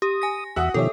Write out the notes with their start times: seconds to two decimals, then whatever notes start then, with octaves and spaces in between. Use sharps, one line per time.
0.02 G4 D#6
0.22 G#5 A#6
0.56 E2 F#4 E5 F#5 D#6
0.74 B2 D#3 F3 G4 A4 C#5 E5